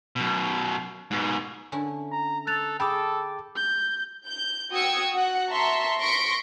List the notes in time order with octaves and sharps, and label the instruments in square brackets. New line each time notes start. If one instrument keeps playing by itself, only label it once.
[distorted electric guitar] F#2 B2
G#2 B2
[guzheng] D3 C#4 E4 [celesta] G#5
[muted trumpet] A#5
[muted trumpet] A4 [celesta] F#6 A6 F7
[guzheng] G#4 [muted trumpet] A4 [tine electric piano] G5 A5 D6 [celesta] B5
[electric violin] G6
[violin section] G6
F#4 G5 D#6 E6 G#6 C#7
F#4 F#5
E5 A5 A#5 C6 C#6 B6
C6 C#6 A#6 B6 C#7 D7